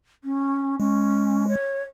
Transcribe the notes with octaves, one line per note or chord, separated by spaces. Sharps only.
C#4
G#3 C#4
C#5